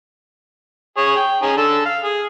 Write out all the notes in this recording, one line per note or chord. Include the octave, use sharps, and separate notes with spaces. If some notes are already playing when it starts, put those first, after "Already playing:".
G#4 C#5
G5
C#4 D#4 G#4
D3 A4
F5
G#4